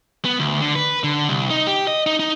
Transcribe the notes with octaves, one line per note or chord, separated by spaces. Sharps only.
B3
D2
D3
B4
D3
C2
D#4
G4
D#5
D#4
D#4